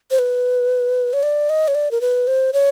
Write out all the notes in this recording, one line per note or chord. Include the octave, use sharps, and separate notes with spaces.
C5
B4
C#5
D5
D#5
C#5
D5
A#4
B4
C5
C#5